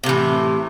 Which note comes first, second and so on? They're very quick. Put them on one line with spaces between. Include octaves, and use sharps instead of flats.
C3 A2 E3